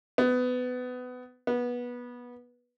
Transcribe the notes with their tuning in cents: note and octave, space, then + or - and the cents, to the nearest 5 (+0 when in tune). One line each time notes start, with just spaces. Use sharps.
B3 +20
B3 -20